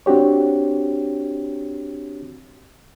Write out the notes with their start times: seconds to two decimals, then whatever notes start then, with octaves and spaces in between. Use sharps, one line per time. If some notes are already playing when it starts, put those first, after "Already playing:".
0.06 C4 D4 F#4 G4 C#5